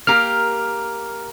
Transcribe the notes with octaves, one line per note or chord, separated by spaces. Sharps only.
A#3 G4 A#4 F6